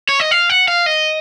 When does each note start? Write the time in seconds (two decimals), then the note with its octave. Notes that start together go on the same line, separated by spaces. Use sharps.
0.09 C#5
0.20 D#5
0.31 F5
0.50 F#5
0.68 F5
0.86 D#5